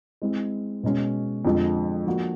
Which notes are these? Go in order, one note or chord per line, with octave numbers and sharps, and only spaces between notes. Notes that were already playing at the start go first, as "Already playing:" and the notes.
G#3 C4 E4
B2 G#3 C#4
F2 D3 F3 G#3
F3 A#3 D4 F#4